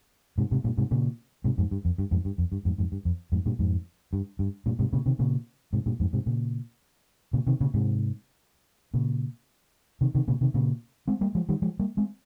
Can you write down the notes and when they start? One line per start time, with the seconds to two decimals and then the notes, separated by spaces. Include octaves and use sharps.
0.38 G#2 C3
0.51 G#2 C3
0.64 G2 A#2
0.78 G#2 C3
0.91 A#2 C#3
1.44 G#2 C3
1.58 F2 G#2
1.71 G2
1.85 F2
1.98 G2
2.11 F2 G#2
2.25 G2
2.38 F2
2.52 G2
2.65 F2 G#2
2.78 F2 G#2
2.92 G2
3.05 F2
3.32 F2 G#2
3.46 G2 A#2
3.59 F2 G#2
4.13 G2
4.39 G2
4.66 G2 A#2
4.79 G#2 C3
4.93 A#2 C#3
5.06 C3 D#3
5.19 A#2 C#3
5.73 G#2 C3
5.86 G2 A#2
6.00 F2 G#2
6.13 G#2 C3
6.26 A#2 C#3
7.33 A#2 C#3
7.47 C3 D#3
7.60 A#2 C#3
7.74 G#2 C3
8.94 A#2 C#3
10.01 C3 D#3
10.15 C3 D#3
10.28 A#2 C#3
10.41 C3 D#3
10.54 A#2 C#3
11.08 G#3 C4
11.21 G3 A#3
11.35 F3 G#3
11.49 D#3 G3
11.62 F3 G#3
11.79 G3 A#3
11.97 G#3 C4